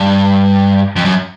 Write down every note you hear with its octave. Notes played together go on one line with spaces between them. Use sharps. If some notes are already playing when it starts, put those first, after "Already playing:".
Already playing: G2
F2
F#2